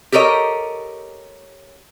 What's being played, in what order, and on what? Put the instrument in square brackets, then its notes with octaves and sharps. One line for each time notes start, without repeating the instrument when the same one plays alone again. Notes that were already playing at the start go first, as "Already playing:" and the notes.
[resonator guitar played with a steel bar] G4 A4 A#4 C#5 D#5